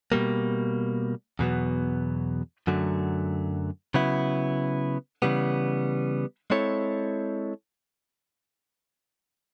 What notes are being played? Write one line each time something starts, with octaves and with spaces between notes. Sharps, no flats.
B2 G3 A#3
E2 B2 F#3 B3
F#2 D3 F#3 A3
C#3 F#3 B3 E4
C#3 E3 G3 B3
G#3 C4 E4 A4 C#5